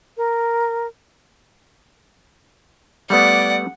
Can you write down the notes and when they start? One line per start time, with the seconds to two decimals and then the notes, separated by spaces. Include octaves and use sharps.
0.17 A#4
3.10 G3 A3 B3 D5 F#5